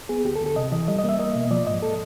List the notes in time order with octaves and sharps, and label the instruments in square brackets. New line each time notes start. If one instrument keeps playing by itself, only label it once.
[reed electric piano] B3 G#4
D2 G4
A4
D2
A4
C3 D#5
E3 D#5
G3 D#5
D#5
A#3 E5
A#3 D#5
B2
F3 D5
G#2 D#5
A4